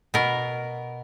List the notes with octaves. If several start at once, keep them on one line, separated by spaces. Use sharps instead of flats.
B2 A#4